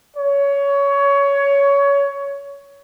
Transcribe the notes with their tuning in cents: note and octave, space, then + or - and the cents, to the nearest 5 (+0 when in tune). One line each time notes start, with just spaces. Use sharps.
C#5 +20